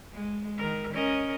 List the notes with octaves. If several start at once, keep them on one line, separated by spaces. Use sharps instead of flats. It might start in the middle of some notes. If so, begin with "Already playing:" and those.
G#3
D#3 A#4
C#4 A#4 D#5